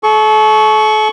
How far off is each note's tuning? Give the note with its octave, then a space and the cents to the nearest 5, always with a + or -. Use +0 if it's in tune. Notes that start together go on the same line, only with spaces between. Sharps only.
A4 -40 C#6 +5